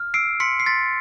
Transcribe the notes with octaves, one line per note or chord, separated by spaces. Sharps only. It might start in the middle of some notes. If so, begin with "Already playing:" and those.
Already playing: F6
E6 C7 D7
C6 B6 C#7
C7
C6 A6 B6